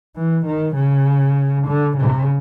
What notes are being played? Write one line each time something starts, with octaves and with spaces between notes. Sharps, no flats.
E3
D#3
C#3
D3
C#3